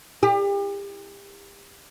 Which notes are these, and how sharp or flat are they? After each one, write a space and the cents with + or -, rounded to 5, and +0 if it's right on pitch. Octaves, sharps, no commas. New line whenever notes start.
G4 +35